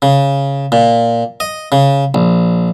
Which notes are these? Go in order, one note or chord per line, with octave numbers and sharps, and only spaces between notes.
C#3
A#2
D#5
C#3
A#1